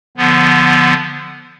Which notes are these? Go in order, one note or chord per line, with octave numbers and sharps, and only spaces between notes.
D3 F3 B3